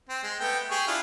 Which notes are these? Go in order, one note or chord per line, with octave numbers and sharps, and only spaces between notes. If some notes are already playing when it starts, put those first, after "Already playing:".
C4
G#3
A3 B3 G5
G4 G#4 C#6
D4 E4 F4